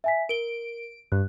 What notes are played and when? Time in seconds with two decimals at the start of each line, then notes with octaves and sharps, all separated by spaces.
0.04 E5 G#5 B6
0.29 A#4 D7 G7
1.12 G2 F#6